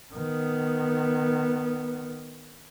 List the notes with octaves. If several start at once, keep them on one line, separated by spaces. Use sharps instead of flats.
D#3 B3